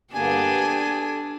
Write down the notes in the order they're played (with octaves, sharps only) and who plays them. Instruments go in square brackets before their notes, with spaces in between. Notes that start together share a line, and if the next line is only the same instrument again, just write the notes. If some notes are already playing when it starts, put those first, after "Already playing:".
[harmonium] G2 D3 A#3 [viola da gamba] B3 G4 G#4 [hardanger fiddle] D4 [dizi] G#5
[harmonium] A4